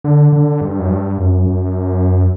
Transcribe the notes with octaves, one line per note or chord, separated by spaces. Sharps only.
D3
D3
G2
F#2
G2
F#2
F#2